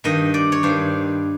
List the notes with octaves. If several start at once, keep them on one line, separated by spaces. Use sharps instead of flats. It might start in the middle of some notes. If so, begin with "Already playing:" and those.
G2 D#3 D#5
D5
C#5
G2 D#3 C5